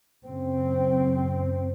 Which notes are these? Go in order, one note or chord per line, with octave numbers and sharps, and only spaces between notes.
F#1 F#2 C#3 C4